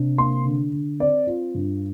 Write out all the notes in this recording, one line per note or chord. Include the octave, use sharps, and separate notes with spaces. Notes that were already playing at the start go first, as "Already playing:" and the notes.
Already playing: C3 D4
A#3 C6
D3
D3
C4 D5
F4
G2